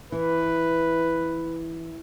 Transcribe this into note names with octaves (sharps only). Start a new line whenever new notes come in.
E3 B4